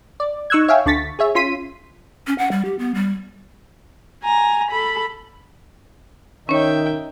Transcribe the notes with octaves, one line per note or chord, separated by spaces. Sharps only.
D5
D#4 C#6 E6 F#6 G#6
C#5 E5 F5 G5 G#5
D2 D3 C#6 A6 B6
G#4 C#5 E5
C#4 F4 C6 B6 D#7
C#4
F#5
G3
G4
B3
G3
G#5 A#5
A4 B5
D#3 C#4 D#4 C#5 E5 G5